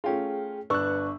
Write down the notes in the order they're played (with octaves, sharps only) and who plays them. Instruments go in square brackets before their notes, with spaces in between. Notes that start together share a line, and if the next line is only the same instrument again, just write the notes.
[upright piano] A3 C#4 F4 [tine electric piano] G#4 G5
[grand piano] G1 D4 C#6 [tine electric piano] B4 F#6 [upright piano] E6